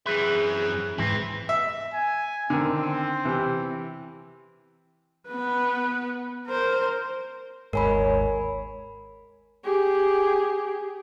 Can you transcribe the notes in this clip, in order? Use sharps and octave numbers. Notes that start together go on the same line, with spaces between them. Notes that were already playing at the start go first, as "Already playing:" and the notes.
F#2 E3 C4 G#4 B4 E5
G#2 E3 C4 E4 B4
E5
G#5
D3 D#3 C4
C3 E3
B3 B4
A#4 C5
G#1 D#2 G#2 A#4 C#5 G#5 B5
G4 G#4